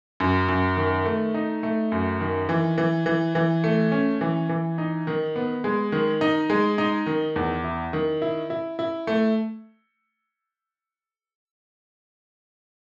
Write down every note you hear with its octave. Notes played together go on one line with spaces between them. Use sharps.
F#2
F#2
D#3
A3
D#4
A3
F#2
D#3
E3
E3
E3
E3
A3
C#4
E3
E3
D#4
D#3
B3
G#3
D#3
D#4
G#3
D#4
D#3
E2
E4
D#3
E4
E4
E4
A3